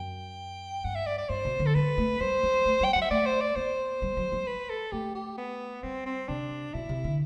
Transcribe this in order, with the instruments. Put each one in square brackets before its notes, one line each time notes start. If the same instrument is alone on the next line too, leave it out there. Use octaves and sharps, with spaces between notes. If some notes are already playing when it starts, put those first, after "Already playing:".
Already playing: [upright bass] F#2 [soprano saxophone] G5
[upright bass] G2 [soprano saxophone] F#5
[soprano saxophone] E5
D5
D5
[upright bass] G2 [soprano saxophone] C5
[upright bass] B2
D3
[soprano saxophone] A4
[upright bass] G3 [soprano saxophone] B4
[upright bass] A3
[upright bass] G3 [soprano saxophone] C5
[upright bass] F#3
A3
[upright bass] G3 [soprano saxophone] G5
[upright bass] F#3 [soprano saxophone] F#5
[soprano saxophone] E5
[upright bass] A3 [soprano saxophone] D5
[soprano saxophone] C5
D5
[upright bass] B3 [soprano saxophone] C5
[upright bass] G3
F#3
G3
[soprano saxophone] B4
A4
[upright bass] A3 [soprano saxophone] G4
[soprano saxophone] G4
B3
[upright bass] G3 [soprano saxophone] C4
[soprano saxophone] C4
[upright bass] C3 [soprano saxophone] D4
[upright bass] B2 [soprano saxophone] E4
[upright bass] C3
D3